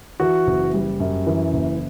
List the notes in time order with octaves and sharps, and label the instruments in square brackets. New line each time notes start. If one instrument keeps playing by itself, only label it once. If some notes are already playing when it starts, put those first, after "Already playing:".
[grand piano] E3 F#4
F#1
G3
F#2
E3
F#1